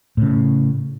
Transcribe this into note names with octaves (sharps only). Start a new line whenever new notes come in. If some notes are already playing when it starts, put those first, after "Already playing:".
A2 C#3